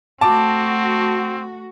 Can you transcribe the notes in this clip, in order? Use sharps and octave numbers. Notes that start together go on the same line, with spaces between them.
A3 C4 F#4 A5 D6